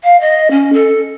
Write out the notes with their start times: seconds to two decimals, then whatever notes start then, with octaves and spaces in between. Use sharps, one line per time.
0.03 F5
0.21 D#5
0.51 C#4
0.73 A4